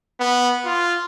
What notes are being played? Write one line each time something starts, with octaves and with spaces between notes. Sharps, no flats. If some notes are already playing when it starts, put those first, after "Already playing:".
B3
F4